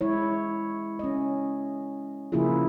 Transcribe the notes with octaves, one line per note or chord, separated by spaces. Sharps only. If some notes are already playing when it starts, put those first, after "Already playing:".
G#3 E4 C#5
C#4 D#5
C#3 F3 A#3 E4 F4 G#4